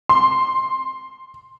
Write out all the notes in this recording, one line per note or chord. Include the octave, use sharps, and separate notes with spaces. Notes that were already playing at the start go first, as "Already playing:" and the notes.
C6